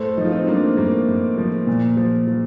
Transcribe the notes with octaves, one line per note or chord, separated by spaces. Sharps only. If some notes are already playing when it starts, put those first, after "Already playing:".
Already playing: A2 A4 C5
F3 D#4
F4
C4 D#4
F3 A#3 D4
A2 A#3
A2
F3
A#2
F3
F3